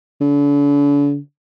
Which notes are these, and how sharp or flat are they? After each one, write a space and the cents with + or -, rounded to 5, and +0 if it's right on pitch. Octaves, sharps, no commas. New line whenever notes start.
D3 -40